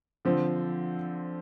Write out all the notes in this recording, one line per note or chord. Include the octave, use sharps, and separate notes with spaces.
D3 F3 C4